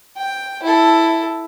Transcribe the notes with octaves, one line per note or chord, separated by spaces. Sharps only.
G5
E4 A4